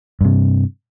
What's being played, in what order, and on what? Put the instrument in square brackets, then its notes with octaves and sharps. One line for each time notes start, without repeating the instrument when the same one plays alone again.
[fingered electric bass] G2 C3